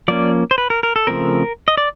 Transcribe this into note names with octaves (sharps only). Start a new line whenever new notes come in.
F3 A#3 C#4 D5
C5
B4
A#4
A#4
A4
C#3 F3 A3 C4 A#4
D#5
D5